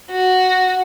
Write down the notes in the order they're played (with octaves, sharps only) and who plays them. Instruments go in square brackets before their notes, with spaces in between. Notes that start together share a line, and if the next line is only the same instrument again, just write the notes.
[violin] F#4